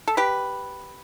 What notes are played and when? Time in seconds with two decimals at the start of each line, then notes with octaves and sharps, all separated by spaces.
0.08 A4
0.17 G4 B4